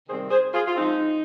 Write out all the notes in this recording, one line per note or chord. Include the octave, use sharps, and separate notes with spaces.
C3 D#3 G3 C4 G#4 C5
G#4 C5
F4 G#4
F4
F3 G#3 C4 D#4